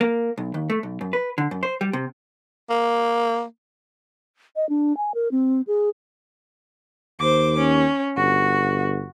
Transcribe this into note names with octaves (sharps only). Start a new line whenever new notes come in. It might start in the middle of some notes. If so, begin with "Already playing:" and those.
A#3
B1
D#2
A3
B1
F#2
B4
D3
F#2
C5
G3
C3
A#3
D#5
D4
G#5
A#4
C4
G#4
D#2 C5 D6
C#4
G1 F#4